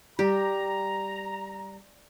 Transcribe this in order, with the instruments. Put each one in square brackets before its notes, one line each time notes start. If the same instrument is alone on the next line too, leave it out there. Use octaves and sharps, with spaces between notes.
[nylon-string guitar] G3 [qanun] G4 [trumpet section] A#5